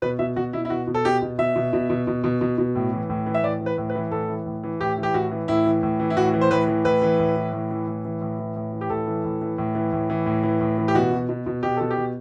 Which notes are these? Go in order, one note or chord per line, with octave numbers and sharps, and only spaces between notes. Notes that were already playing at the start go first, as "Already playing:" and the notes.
B2 B4
B2 E5
B2 F#4
B2 E4
E4
B2 F#4
B2
A4
B2 G4
B2
B2 E5
B2
B2
B2
B2
B2
B2
B2
A2
E3
A2
E3
E5
A2 D5
E3
B4
A2
B4
E3
A2 A4
E3
A2
E3
A2 G4
E3
G4
A2 F#4
E3
A2 E4
E3
A2
E3
E4
A2 F#4
E3
C5
A2 B4
E3
A2 B4
E3
A2
E3
A2
E3
A2
E3
A2
E3
A2
E3
G4
A2 A4
E3
A2
E3
A2
E3
A2
E3
A2
E3
A2
E3
G4
B2 F#4
B2
B2
B2
B2 G4
B2 A4
G4
B2